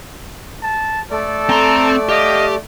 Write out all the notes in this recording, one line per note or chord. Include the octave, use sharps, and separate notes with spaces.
A5
A3 A4 D5
C4 A#5 C6
G4 D#5 F5